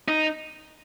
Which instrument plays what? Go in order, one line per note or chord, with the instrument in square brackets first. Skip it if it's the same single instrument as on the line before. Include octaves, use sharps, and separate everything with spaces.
[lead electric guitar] D#4